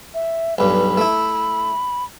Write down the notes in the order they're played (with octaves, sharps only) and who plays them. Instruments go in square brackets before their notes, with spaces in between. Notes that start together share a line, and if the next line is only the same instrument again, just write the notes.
[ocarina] E5
[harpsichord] B1 G2 [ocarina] B5
[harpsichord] A3 E4